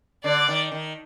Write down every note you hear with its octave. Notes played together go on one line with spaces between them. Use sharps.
D3 D5
D#3
D#3